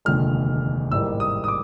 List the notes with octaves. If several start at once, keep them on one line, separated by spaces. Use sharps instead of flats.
F1 D#2 D3 F3 G#3 F6
A1 G#2 E3 G3 A#3 E6
D#6
D#6
D6